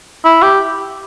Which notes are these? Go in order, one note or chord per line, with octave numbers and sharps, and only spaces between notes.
E4
G4